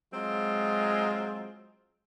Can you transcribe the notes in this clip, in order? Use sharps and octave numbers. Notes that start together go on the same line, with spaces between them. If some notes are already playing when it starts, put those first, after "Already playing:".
F#3 G#3 C4 F4